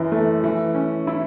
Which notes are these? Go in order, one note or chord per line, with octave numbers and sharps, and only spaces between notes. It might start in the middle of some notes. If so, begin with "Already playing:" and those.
Already playing: F#2 E3
A3
E3
C#4
E4